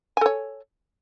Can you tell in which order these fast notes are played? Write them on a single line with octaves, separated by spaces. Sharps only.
G#5 A4 C#5